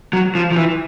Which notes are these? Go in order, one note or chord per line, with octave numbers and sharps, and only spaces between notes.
F#3
F3
F3
E3